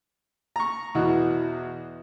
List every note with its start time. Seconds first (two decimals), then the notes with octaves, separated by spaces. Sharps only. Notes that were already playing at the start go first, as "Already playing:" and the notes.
0.56 A#5 C#6
0.95 E2 B2 F#4